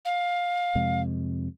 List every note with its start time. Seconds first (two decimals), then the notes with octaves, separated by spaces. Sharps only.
0.05 F5
0.75 F2 C3 G#3